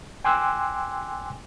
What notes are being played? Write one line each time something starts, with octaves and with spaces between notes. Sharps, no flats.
G5 G#5 C6 D6 E6 F#6